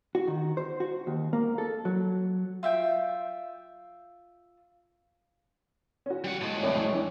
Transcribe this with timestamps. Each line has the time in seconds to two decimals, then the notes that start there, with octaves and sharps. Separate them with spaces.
0.15 F#4
0.28 D#3
0.57 C5
0.80 F#4
1.07 D#2
1.33 A#3
1.58 A4
1.85 F#3
2.63 F4 E5 G5
6.06 C#4 F#4
6.24 G3 F#5
6.41 A2 G#3
6.63 F1 C2 C#5
6.76 C#2
6.92 E3 D4